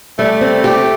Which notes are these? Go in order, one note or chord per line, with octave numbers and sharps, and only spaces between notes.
G3 A3
C4
G4